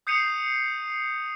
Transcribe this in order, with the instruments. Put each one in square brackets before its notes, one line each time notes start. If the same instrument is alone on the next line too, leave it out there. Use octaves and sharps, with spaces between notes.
[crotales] D#6 G6 C7 C#7 D#7 F7